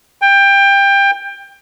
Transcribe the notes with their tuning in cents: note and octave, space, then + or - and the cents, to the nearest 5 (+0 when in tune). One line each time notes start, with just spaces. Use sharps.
G5 +20